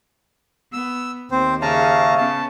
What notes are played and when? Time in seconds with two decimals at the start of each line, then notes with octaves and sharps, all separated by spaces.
0.73 B3 E6
1.31 D#2 C4 C5
1.62 C#3 E5 F5 A5 A#5
2.17 B3 C#4 A5